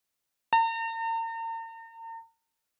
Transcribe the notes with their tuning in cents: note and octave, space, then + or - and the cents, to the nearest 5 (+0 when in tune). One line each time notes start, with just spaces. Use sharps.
A#5 -45